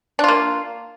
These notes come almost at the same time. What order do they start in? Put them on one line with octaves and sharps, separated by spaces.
D4 F4 A#3